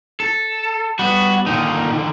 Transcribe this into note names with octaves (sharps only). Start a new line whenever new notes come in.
A4
G3 B3 F#4
A#2 D3 D#3 D#4